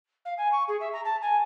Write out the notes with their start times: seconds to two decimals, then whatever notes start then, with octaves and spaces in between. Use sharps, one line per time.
0.25 F5
0.37 G#5
0.52 C#6
0.68 G#4
0.80 E5
0.93 A#5
1.04 A5
1.21 G#5